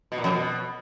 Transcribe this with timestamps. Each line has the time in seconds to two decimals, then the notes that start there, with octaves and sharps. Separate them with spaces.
0.12 B2
0.18 A#2
0.24 F2
0.30 B2